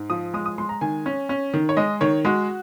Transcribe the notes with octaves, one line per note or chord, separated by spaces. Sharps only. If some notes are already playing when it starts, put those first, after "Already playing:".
Already playing: G#2
F3 D#6
G#3 D#6
D#6
G#3 C6
A#5
D#3 G#5
C#4
C#4
D#3
C#5
G#3 D#5
D#3 C#5
G#3 F#4